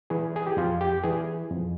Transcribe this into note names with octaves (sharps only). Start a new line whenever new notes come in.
E3 G#4
G#4
G4
F2 F4
G4
E3 G#4
F2